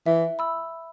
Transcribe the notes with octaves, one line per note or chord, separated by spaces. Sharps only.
E3 E5
B5 E6